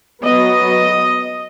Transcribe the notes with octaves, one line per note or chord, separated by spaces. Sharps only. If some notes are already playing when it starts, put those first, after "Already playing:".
F#3 B3 D#5